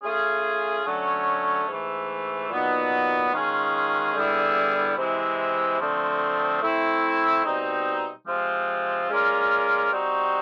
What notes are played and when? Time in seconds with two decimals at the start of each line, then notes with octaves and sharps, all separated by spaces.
0.03 A3 C#4 F4 G#4
0.85 D3 F#3 A3 C#4
1.67 G#2 E3 A3
2.49 A#2 F#3 B3 D#4 F#4
3.32 D#3 G#3 C#4 F4 G#4
4.14 D3 G3 B3 E4 G#4
4.97 C3 E3 G#3 C4 E4
5.80 D3 F3 A3 C4
6.62 A3 C4 E4
7.44 B2 G3 C4 D#4
8.26 C3 F3 G#3 C4 F4
9.09 G#3 C#4 F4 A#4 D5
9.92 G3 C4 D#4 F#4